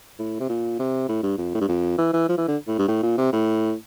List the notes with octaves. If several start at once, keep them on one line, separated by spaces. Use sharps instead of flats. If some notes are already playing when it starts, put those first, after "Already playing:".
A2
C3
A#2
C3
A2
G2
F2
A2
G2
F2
E3
E3
F3
E3
D3
A2
G2
A2
A#2
C3
A2